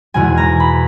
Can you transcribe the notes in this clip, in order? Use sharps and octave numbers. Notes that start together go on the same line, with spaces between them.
E2 B2 G#3 G#5
A#5
B5